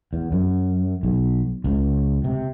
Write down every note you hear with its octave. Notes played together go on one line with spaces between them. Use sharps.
E2
F#2
B1
C#2
C3